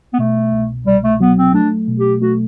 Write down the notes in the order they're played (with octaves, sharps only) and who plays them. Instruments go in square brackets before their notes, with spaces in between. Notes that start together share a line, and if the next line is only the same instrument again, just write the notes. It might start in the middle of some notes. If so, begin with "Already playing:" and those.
[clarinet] B3
[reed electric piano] B2 [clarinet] A3
[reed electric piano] C2
[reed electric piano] C2 [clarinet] G3
[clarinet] A3
[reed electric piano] F#3 [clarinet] B3
[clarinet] C4
[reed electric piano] A3 [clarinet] D4
[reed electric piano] B2
[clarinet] G4
[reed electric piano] A3 [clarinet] F#4